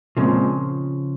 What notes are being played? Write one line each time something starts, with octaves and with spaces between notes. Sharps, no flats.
A#2 C#3 F3 G#3 C4